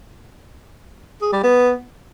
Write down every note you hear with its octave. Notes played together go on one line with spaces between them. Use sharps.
G#4
G3
B3